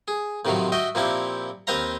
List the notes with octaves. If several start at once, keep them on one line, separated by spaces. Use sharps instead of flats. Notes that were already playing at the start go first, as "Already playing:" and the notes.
G#4
A2 C3 D#3 F3 F#3
F#4 D#5 E5 G5
A#2 F3 A#3 C4 E4 G4
D#2 C4 B4 C5 F5 A#5